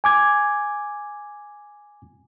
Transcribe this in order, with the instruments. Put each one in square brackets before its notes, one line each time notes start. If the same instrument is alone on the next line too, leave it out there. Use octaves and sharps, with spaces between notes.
[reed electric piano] G#5 D6 G#6